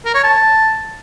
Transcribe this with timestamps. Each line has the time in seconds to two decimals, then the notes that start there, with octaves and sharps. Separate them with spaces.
0.05 A#4
0.14 C#5
0.24 A5